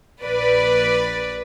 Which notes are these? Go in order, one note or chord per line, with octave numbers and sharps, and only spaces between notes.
A#1 B4 D5